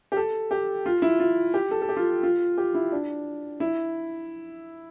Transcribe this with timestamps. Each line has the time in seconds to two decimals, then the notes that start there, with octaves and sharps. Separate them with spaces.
0.12 G4
0.17 A4
0.51 G4
0.86 F4
1.02 E4
1.20 F4
1.54 G4
1.71 A4
1.82 A4
1.89 G4
1.97 F4
2.23 F4
2.57 G4
2.75 E4
2.92 D4
3.60 E4